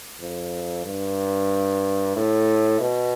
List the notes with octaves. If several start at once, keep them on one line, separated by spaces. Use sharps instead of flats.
F2
G2
A2
B2